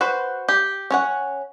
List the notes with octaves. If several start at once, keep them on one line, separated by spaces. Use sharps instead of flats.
F#4 B4 C5
G4
C#4 C#5 F#5